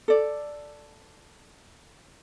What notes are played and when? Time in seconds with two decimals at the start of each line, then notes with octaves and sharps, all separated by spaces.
0.08 A4 D5